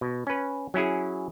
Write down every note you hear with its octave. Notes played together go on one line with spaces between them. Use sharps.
B2
C#4 B4
F#3 C#4 E4 G#4